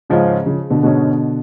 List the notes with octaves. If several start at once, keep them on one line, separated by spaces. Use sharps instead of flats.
G#2 C#3 F3 G#3 C#4 F4
C#3 F3
B2 D3
G#2 B2 D3 G#3 C#4